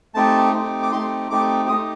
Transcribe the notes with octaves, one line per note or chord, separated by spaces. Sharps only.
A3 C4 D#4 G4 A5
A3 C4 D#4 G4
D6
A3 C4 D#4 G4 C6
A3 C4 D#4 G4 D6
A3 D#4 G4 D#6